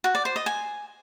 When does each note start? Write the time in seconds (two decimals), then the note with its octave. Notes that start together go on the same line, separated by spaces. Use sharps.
0.04 F#4
0.15 D5
0.25 C5
0.36 D#5
0.46 G#5